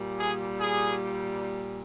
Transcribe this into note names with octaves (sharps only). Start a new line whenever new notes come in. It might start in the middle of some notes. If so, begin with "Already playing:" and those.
Already playing: A#2 G3
G#4
G#4